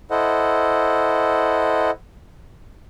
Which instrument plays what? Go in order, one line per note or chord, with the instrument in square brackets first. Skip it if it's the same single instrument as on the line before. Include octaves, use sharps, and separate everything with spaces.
[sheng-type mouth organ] E4 A4 C5 D#5 F#5